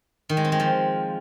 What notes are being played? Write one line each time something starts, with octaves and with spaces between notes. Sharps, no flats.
D#3
G#3
C4
G#3
F3